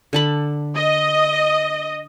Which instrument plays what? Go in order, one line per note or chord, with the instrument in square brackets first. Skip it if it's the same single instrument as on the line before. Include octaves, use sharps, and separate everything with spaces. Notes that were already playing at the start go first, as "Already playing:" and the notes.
[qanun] D3 A5 B5
[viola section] D#5